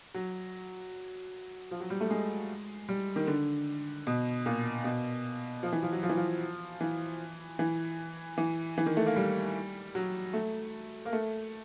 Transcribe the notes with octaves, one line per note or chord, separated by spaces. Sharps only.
F#3
F3
F#3
G3
A3
G#3
G3
D#3
D3
B2
A#2
B2
F3
E3
F3
F#3
F3
E3
F3
E3
E3
E3
E3
D#3
A3
A#3
G3
F#3
A3
A#3
A3